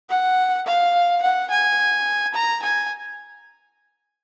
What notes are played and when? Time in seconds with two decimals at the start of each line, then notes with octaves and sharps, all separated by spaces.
0.10 F#5
0.66 F5
1.23 F#5
1.51 G#5
2.34 A#5
2.63 G#5